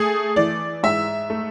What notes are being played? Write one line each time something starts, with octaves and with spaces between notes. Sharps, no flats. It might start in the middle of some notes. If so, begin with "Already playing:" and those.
Already playing: A3 G#4
E3 D5
G#2 E5
A3